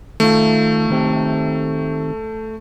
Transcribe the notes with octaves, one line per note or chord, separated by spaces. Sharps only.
D#3 A3 F4
D#3 C4 G4